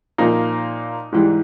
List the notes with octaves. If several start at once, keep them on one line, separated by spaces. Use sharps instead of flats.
A#2 F3 A#3 D#4
G#2 E3 G3